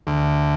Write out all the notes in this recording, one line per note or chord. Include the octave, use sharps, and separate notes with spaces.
D2